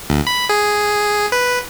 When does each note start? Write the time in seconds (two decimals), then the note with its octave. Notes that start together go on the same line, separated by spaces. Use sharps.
0.10 D2
0.27 B5
0.49 G#4
1.32 B4